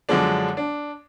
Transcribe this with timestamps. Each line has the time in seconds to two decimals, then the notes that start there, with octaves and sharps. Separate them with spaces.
0.09 F#2 D3 F3 G#3 D4
0.57 D4